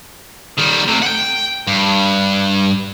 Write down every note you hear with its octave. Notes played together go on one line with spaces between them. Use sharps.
D#3 G3
C3 A3
F#5 G5
G2